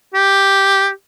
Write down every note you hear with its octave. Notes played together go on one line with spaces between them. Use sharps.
G4